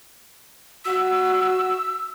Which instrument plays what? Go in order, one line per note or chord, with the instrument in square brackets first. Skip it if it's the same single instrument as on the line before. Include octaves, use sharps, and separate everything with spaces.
[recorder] F#4 [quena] E6